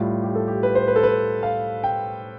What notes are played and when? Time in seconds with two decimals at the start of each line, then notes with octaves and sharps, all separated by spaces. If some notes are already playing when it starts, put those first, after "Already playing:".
Already playing: A2 G3 F4
0.23 G4
0.35 A4
0.48 G4
0.63 B4
0.75 C5
0.88 B4
0.96 A4
1.03 B4
1.43 F5
1.84 G5